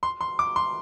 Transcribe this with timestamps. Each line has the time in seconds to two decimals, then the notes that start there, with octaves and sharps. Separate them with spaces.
0.03 C6
0.21 C6
0.39 D6
0.56 C6